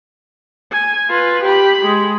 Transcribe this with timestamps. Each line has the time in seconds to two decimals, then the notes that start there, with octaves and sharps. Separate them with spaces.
0.72 G#5
1.10 F4 B4
1.44 G4 B5
1.86 G#3